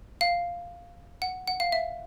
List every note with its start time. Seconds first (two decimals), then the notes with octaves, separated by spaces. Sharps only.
0.21 F5
1.22 F#5
1.47 F#5
1.60 F5
1.72 E5